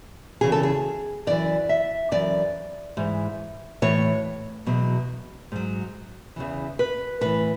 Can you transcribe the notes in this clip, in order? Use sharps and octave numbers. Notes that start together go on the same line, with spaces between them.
E2 C#3 E3 G#4
A4
G#4
F#2 E3 D5
E5
F#2 E3 D5
G#2 E3
A2 E3 C#5
E2 B2 F#3
G#2 F#3
E2 C#3 E3
B4
A2 E3 B4